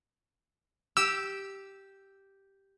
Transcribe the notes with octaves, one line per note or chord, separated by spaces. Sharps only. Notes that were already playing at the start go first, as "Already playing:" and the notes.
G4 E6